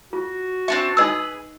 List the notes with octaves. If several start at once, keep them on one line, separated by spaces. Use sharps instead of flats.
F4 F#4
C4 D4 E5 C#6
D#4 G#4 B4 D#5 E6